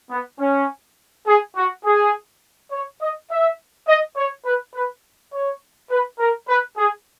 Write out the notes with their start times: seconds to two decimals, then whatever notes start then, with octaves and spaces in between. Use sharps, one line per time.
0.10 B3
0.39 C#4
1.27 G#4
1.56 F#4
1.85 G#4
2.72 C#5
3.01 D#5
3.30 E5
3.88 D#5
4.17 C#5
4.45 B4
4.74 B4
5.33 C#5
5.91 B4
6.19 A#4
6.49 B4
6.78 G#4